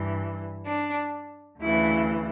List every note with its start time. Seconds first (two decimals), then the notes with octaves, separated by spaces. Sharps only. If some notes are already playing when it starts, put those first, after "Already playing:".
Already playing: G2 E3
0.65 D4
1.59 D2 C#3 E3 E4